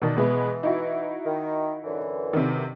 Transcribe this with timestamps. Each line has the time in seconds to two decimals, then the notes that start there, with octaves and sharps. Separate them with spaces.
0.02 B2 D#3 D5 A5
0.16 B2 E3 G#3 B3
0.63 D#4 E4 F#4
1.25 D#3
1.83 F#2 D3 E3
2.33 C3 D#3